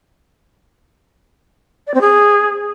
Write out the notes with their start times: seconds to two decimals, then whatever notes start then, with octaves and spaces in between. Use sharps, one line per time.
1.87 D5
1.94 C4
2.01 G#4